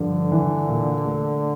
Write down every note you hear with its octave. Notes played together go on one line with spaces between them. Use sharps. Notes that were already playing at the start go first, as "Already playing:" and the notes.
Already playing: G2 D3 F3
E3
A#2
A3